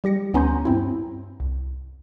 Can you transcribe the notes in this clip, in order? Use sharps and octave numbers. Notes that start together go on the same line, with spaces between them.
G3 G4 A#6 C#7
D2 B3 C#4 A#5 C6 G6
G2 C4 E4
C2